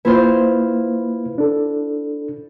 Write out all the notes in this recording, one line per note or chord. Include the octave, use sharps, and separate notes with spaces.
A#3 E4 F4 B4 C5
D4 A4